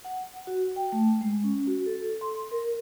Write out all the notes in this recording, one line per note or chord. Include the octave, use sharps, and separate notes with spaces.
F#5
F#4
G5
A3
G#3
C#4
F#4
A4
C6
A#4